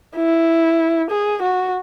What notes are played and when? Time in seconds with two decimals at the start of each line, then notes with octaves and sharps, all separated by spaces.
0.16 E4
1.10 G#4
1.42 F#4